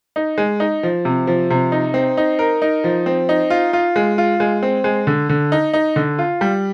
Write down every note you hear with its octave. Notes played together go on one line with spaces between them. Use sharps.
D#4
G#3
D#4
F3
C3
F3
C3
D#4
C4
D#4
A#4
D#4
F3
C4
D#4
F4
F4
G#3
F4
G#3
C4
G#3
D3
D3
D#4
D#4
D3
F4
G3